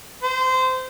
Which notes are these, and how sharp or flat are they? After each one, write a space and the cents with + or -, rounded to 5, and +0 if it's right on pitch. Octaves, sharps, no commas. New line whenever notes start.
C5 -20